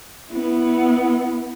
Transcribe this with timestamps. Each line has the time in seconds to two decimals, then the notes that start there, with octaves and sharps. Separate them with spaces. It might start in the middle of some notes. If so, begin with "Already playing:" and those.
0.32 B3 E4